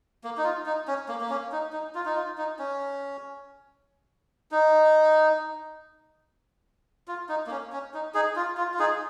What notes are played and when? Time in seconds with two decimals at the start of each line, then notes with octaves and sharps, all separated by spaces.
0.24 A#3
0.37 D#4
0.44 F4
0.66 D#4
0.88 C#4
1.09 A#3
1.21 A#3
1.30 C#4
1.52 D#4
1.73 D#4
1.95 F4
2.06 D#4
2.15 F4
2.38 D#4
2.59 C#4
4.51 D#4
7.08 F4
7.29 D#4
7.47 A#3
7.51 C#4
7.72 C#4
7.94 D#4
8.14 D#4 G#4
8.36 F4
8.57 F4
8.74 F4
8.79 D#4 G#4